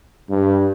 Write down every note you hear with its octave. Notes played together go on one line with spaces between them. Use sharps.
G2